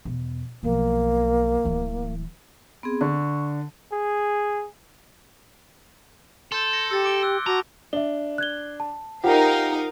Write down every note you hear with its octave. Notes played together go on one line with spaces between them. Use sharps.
E2 B2
B1 F3 A#3
D1 E3
B3 C4 G#4
D3 C#6
G#4
A4 C6 G6
A#6 C#7
G4 E6 A6
D6 D7 G7
E6 F#6
F#4 A5 A#5 D6 A#6
D4 E5 G7
F#6 G#6 G7
A5
D#4 F4 G4 A#4 C5 F5 F#5